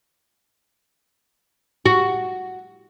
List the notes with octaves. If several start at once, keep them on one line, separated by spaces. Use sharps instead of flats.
F#4